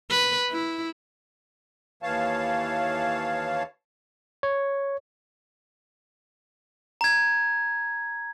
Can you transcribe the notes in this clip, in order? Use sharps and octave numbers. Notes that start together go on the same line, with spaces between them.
B4
E4
D#2 E3 C#5 F5 A5
C#5
A#5 G#6